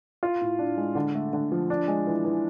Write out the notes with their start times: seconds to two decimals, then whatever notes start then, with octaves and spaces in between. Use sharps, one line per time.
0.23 F4
0.41 A2
0.59 D4
0.77 G#3
0.95 D3
1.14 A3
1.33 D3
1.52 F3
1.70 D4
1.88 G#3
2.07 E3
2.25 E3